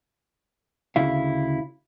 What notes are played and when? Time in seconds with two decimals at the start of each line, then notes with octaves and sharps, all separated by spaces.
0.96 D2 C#3 E4 F5